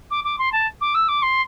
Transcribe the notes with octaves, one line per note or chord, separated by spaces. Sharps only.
D6
D6
C6
A5
D6
E6
D6
C6